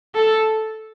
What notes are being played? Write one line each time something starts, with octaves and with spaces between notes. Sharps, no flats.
A4